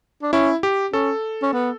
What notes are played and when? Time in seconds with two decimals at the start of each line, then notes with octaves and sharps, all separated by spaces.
0.22 D4
0.33 C#4 E4
0.63 G4
0.93 C#4 A4
1.43 C#4
1.53 B3